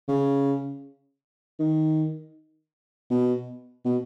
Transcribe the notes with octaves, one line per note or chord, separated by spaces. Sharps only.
C#3
D#3
B2
B2